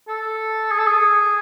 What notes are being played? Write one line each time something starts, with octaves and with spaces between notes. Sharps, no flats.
A4
G#4
A4
G#4